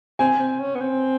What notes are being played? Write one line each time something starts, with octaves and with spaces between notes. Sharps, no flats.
C4 G#5
C4
C#4
B3
C4